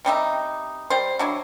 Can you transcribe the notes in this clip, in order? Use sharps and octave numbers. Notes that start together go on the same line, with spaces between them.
C3 G3 D#4 E5
G3 C5
F#3 D4 E4